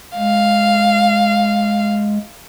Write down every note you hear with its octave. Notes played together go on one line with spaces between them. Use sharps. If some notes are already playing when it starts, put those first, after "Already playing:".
G#3 F5